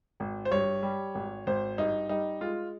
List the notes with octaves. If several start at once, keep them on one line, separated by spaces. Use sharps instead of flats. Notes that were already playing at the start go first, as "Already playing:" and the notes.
G#1
C5
G2 C#5
G3
G#1
G#1 C5
G2 D#4
G3 D#4
G#3 F4